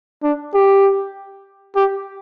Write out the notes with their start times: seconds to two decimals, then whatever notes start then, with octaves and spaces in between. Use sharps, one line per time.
0.23 D4
0.54 G4
1.76 G4